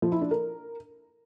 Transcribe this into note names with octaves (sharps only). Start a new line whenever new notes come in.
F3
E4
D4
A#4